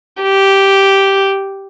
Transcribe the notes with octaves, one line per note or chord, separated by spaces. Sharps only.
G4